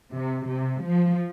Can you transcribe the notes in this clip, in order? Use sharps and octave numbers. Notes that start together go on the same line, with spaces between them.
C3
C3
F3